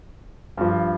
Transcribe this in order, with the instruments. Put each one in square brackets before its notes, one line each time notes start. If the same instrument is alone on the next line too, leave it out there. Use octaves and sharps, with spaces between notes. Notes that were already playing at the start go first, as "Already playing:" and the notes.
[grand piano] G2 F3